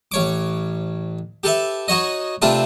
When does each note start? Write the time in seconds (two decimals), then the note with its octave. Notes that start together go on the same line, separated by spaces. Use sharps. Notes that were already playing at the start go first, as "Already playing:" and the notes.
0.12 A1 C#5 D6
1.44 G4 A4 B4 E5
1.88 D#4 F#4 C#5 D#5
2.42 C3 A3 C4 D4 F4 B4